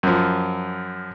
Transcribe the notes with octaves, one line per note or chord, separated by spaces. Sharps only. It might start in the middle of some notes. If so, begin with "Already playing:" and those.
F#2 F3